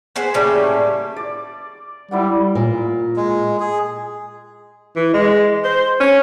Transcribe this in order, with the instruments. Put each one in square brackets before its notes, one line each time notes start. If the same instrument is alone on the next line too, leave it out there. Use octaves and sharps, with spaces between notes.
[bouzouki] B3 G#4 C5
A2 C#3 G3 A#3
[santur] D5
[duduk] G3 [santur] E4 D5 F#5
[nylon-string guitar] A#2
[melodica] G#3
G#4
[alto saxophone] E3
G#3
C5
C#4